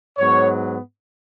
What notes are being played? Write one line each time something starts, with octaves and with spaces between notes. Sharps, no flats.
G#2 F#3 B3 C#5